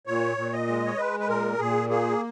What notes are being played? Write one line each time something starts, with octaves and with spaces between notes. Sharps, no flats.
A#2 C#5
A#2
D#5
G#3
C#5
G#3 B4
B4
A#2 A#4
A#2 G#4
A#3 G#4